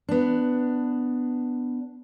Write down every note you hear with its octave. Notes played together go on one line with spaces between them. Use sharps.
B3 D4